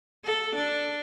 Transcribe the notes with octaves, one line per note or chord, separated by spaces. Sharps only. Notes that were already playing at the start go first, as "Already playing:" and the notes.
A4
D4